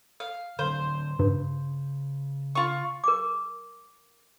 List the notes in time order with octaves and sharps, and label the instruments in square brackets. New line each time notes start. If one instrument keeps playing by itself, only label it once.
[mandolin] F5
[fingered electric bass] D3 F#3 C4 [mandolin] C5
[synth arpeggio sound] G2 [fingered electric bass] C#3
[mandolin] F4 C#6
[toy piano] A#4 D6